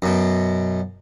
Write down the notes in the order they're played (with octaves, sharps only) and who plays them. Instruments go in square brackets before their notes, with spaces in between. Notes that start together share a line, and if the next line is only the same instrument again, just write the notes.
[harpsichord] F#2 B2